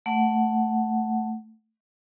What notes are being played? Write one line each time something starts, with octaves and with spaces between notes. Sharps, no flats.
A3 F#5